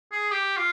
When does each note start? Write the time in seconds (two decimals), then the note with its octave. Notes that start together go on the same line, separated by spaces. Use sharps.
0.12 G#4
0.31 G4
0.57 F4